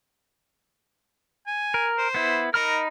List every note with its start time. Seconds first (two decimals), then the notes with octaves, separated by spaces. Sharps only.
1.47 G#5
1.74 A#4
1.98 C5
2.15 B3 E4
2.54 D#4 A#4 B5 F6